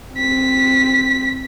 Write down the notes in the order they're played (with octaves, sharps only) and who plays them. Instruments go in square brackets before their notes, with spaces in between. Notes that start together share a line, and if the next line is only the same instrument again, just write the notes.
[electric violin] C4 B6